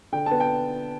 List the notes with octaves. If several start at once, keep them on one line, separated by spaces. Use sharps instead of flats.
D3 G5
B3 A5
G5